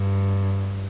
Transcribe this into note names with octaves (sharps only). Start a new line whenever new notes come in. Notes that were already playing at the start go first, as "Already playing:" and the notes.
Already playing: G2